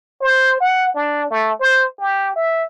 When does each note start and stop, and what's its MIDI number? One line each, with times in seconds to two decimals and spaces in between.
0.22 0.57 72
0.60 0.92 78
0.94 1.30 62
1.31 1.52 57
1.60 1.85 72
2.00 2.35 67
2.36 2.63 76